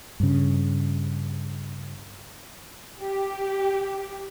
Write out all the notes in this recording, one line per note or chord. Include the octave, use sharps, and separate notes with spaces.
G2 C#3
G4